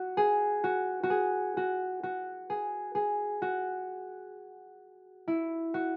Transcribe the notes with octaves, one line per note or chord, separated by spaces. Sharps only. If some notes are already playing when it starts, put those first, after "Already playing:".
Already playing: F#4
G#4
F#4
F#4
G#4
F#4
F#4
G#4
G#4
F#4
E4
F#4